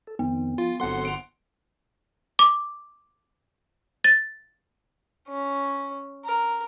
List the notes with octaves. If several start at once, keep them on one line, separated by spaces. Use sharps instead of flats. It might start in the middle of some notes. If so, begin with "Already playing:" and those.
A4
F2 D#3 B3 C4
F3 F4
G1 F#3 C4 A4 F#5 C6
D7 F7
D6
A6
C#4
A#4